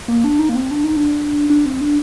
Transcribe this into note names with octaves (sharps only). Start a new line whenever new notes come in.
A#3
D4
D#4
A#3
C4
D4
D#4
D4
D4
C4
D4